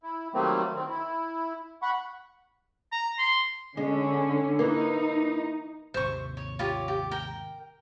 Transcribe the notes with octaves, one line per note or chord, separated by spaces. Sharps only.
E4
D#3 F#3 G3 A3 A#3 C4
D#3 C4
E4
F#5 B5 C#6
A#5
C6
D3 G#3 C#4
E3 A#3 D#4
G#1 D#2 C3 C5 C#6
C#5
F4 G4 C#5
G4
A#4 G5